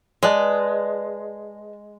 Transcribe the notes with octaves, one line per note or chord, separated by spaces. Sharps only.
G#3 B4 D5 A5